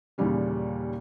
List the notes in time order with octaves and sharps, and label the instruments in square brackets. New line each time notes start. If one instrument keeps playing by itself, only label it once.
[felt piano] D#2 A#2 C#3 E3 G3 C#4